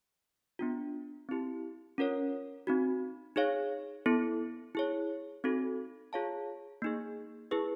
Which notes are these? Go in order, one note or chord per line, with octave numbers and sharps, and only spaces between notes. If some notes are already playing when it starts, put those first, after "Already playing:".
B3 D4 F4
C4 E4 G4
C#4 F4 A#4 C#5
C4 D#4 F#4
D#4 G#4 C#5 F5
B3 E4 A4
E4 G#4 C#5
C4 D#4 F#4 A4
F4 G#4 C#5 F5 A5
A#3 D#4 G#4
E4 G#4 B4